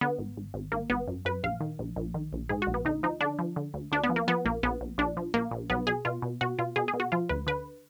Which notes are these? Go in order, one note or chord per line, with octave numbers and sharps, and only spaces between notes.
D3 B3
G#1
G#1
G#1
G#1 A#3
G#1 B3
F#2
F#2 B4
A#1 F5
D#3
A#1
A#1
D#3
A#1
G#2 G#4
F#4
A#1
B3
D2 D#4
F3 D#4
D3 D4
F3
D3
D2
D2 D4
B3
F3
A#3
F3 B3
A#1 A#3
A#1 B3
A#1
A#1 D4
F3
A#1 A#3
A#1
B1 B3
B2 G#4
B2 F4
B2
B2 F#4
B2 F4
B2 G#4
G#4
B2
F#4
F3 F4
D2 B4
D3 B4